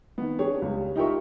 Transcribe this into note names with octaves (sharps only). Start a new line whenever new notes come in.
D#3 B3
D4 G4 G#4 C#5
C#2 G3
D#4 F4 G4 A#4 E5 C#6